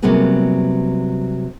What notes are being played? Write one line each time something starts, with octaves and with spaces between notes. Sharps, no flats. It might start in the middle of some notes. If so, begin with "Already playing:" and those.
C3 F#3 G3 A#3 B3 G#4